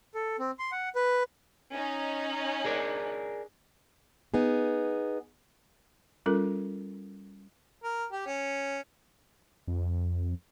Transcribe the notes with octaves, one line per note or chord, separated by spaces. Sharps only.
A4
C4
C6
F#5
B4
C#4 D#4
G#4 A#4 D5
B3 D#4 G#4
G3 C#4 F4 A4 A#4
A#4
G4
C#4
F2